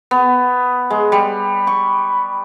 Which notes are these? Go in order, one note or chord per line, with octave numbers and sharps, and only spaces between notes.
B3
G#3
G3
C#6